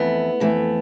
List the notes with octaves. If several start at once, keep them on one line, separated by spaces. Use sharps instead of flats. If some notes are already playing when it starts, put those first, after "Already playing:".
Already playing: F2 E3 A3 B3
F2 E3 A3